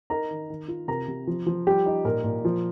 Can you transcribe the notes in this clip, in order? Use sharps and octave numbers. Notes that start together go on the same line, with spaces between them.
D#4 A#4 A#5
D#3
D#3
F4
C3 A#4 A#5
C3
F3
F3
G3 G4
D#4
A#2 A#4
A#2
F3